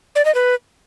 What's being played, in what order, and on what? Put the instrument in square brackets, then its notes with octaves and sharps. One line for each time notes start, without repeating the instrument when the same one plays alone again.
[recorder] D5
D#5
B4